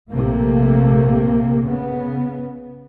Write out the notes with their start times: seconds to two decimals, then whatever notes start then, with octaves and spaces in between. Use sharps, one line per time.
0.10 A#1 C3 A3 A#3
1.67 C#3 B3